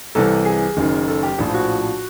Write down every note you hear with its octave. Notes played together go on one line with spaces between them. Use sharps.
C2 C3 E3 A4
G#4
F#1 F#2 D#3
A4
G4
A#1 A2 F3
F#4